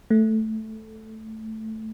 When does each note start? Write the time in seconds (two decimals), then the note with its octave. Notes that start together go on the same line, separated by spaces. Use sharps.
0.10 A3